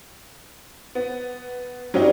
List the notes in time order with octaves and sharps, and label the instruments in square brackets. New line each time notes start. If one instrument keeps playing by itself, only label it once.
[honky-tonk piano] B3
[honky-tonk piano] F#3 C#4 D#4 [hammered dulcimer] G3 C4